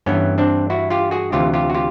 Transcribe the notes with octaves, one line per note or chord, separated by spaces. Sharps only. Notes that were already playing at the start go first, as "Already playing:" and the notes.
G2 E3 B3 C#4
C4 D4
E4 F#4
F4 G4
F#4 G#4
D2 C3 E3 F4 G4
F4 G4
F#4
F4 G4